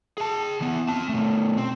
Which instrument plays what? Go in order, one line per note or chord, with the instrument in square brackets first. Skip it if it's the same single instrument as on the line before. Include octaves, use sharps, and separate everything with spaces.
[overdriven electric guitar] G#4 A5
E3 B3
C4 A5
B2 A3
C4